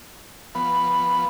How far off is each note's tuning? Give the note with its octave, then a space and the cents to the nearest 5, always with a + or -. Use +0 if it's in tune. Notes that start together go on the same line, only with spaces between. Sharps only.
F3 -20 B3 +0